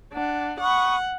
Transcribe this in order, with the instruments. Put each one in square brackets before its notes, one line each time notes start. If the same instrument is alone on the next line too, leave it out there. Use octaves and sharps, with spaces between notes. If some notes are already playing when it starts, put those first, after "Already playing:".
[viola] D4 [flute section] F#5
[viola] F#5 [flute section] B5 C#6 D#6